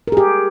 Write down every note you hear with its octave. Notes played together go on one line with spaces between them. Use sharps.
G4 G#4 A#4